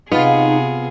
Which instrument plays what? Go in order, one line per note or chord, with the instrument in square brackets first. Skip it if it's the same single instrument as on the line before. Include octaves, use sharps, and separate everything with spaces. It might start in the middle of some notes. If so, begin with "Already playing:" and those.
[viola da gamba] C3 G#4 [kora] B3 [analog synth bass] D#4 [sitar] F4